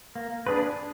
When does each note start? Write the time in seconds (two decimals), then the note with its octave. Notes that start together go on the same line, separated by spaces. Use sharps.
0.15 A#3
0.47 D4 G#4 B4